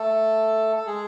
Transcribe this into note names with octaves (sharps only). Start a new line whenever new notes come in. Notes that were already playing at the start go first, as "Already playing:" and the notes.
Already playing: A3 A4
A4
G#3 G#4